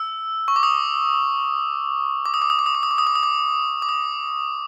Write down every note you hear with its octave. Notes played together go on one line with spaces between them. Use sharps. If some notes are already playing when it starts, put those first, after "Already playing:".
Already playing: E6
C#6
D6
D#6
D6
D#6
D6
D#6
D6
D#6
D6
D#6
D6
D#6
D6
D#6
D6
D6
D#6